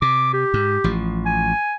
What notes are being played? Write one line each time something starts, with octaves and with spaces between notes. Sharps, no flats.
C3 D6
G4
G#2
A1 F3
G#5